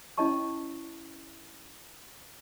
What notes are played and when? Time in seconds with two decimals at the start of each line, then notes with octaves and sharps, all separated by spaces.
0.18 C#4 E4 C#5 D#5 A5 C#6